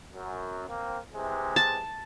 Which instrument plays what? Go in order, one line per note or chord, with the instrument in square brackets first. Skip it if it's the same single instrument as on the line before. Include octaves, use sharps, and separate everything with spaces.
[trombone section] F#2
A#3 C4
C3 E3 G#3
[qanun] A5